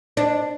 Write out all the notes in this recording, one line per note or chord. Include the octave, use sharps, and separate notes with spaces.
D4